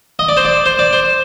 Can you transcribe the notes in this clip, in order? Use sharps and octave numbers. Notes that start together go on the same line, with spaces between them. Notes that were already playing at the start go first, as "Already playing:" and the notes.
D#5
D5
C5
D5
C5
D5
C5